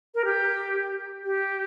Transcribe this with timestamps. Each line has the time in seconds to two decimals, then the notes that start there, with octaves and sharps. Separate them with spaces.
0.15 A#4
0.25 G4
1.24 G4